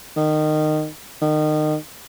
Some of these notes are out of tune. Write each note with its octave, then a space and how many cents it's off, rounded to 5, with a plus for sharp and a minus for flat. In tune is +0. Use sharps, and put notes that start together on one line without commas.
D#3 -20
D#3 -25